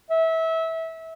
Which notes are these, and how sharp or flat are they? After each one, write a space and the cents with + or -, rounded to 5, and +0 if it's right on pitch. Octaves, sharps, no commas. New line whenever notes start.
E5 -25